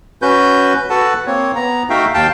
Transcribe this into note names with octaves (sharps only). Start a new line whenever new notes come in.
C#4 F#4 B4 G6
F#4 A4 B4 F#5 A5
A#3 C4 C#5
B3 A#5
A3 D#4 F#4 E5 F5 G5
D#2 F5 G5 A5